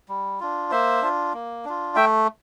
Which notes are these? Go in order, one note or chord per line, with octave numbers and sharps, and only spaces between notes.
G3
D4 F4
A#3 C5 E5
D4 F4
A#3
D4 F4
A3 E5 G5